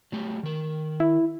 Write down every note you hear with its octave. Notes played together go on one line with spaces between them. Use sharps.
F#3 A3 G4
D#3 A#4
E4